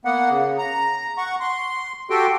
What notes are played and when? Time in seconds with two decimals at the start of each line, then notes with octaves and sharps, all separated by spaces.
0.05 A#3 B3 F#5
0.30 C#3
0.58 A#5
1.18 F#5 C#6
1.40 C6
2.10 F#4 G4 A4 G5 C6